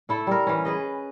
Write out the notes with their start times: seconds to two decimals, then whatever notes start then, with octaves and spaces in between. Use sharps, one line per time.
0.09 A3 E4 A4
0.27 G3 A#4
0.47 E3 C#4
0.65 G#4 B4 D#5